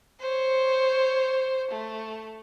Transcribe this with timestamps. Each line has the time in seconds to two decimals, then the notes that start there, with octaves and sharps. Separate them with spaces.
0.20 C5 C#5
1.71 A3